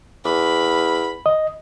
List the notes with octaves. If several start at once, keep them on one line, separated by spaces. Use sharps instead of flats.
E2 B5
D#5